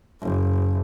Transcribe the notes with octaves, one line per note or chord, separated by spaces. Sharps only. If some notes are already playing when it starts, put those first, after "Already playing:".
F#1